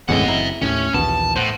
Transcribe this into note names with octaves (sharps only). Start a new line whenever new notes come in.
F#1 E2 A2 G#3 C4 D#5 F#5
E4 A#5
D#2 A2 D#3 C#4
A#1 D#2 E3 B3 A5
A2 C5 F#5